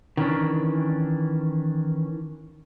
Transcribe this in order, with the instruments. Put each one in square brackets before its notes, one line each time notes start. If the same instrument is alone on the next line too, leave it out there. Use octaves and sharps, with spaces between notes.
[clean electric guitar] D#3 E3 C#4 D4